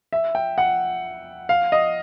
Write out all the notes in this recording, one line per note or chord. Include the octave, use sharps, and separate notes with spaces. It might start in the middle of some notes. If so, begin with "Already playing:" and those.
E5
G5
F#5
F5
D#5